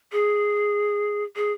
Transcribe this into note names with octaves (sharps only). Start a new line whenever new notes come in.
G#4
G#4